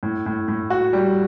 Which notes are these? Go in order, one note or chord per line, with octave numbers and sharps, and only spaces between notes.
A2
A2
A2
F#4
G3